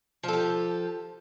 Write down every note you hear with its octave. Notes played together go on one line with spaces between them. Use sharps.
F3 G4 A4